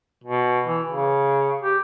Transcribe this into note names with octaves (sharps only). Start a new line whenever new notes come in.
B2
E3
C#3
G4